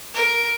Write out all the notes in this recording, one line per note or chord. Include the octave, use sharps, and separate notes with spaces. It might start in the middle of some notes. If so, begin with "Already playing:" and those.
A#4